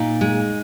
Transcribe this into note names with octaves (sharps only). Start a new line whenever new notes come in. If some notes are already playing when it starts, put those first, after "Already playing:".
Already playing: A#2 D#4
G#3